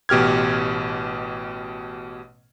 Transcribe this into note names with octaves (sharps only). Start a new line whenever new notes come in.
A1 B2 G4 F6 G#6